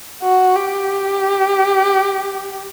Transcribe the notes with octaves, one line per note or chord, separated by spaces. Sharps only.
F#4
G4